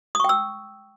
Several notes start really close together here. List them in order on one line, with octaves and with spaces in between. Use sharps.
D#6 C#6 G5 E6